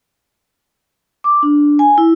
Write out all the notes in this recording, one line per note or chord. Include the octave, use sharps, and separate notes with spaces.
D6
D4
G#5
E4